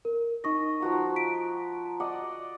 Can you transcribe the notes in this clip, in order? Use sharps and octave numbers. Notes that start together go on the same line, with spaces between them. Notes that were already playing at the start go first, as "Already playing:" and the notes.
A#4
D#4 D#5 C#6 A#6
F3 F#4 A#5
B6 D7
A#5
D5 D#5 F#5